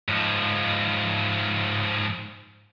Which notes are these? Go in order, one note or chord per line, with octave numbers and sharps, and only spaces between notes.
G#2 F3